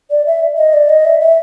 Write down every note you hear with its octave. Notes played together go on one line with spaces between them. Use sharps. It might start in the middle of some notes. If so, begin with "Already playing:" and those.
D5
E5
D#5
D5
D#5
E5
E5